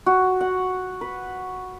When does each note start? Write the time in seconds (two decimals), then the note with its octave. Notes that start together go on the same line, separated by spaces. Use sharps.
0.06 F#4
0.41 F#5
1.01 B4